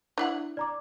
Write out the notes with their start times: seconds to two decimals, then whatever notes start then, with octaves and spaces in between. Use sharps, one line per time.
0.18 D4 E4 F#5
0.57 D5 A#5 D6